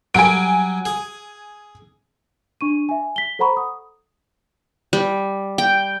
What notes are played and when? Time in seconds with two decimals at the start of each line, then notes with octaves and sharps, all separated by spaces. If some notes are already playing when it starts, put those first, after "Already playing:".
0.15 F#3 G3 G#5 D7
0.85 G#4
2.61 D4 C#6 D#7
2.89 E5 G#5
3.16 B6 G7
3.39 A4 C5 F#5 A#5 B5 C#6
3.57 D#6
4.93 G3
5.58 G5